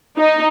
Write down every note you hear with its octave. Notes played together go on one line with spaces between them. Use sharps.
D#4